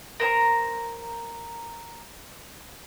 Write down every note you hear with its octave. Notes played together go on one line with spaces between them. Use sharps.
A#4 C5 A#5